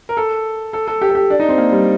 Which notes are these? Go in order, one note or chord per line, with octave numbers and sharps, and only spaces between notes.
A#4
A4
A4
A4
G4
A4
G4
D4
D#4
C4
A#3
G3